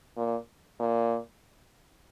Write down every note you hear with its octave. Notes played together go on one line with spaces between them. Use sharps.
A#2
A#2